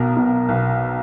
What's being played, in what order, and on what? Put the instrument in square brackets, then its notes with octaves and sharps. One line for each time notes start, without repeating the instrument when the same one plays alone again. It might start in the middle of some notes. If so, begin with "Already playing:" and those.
Already playing: [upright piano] B1 B2 A#4
B2
B1